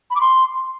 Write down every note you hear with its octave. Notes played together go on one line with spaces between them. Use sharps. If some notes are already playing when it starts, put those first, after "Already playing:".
B5
D6
C6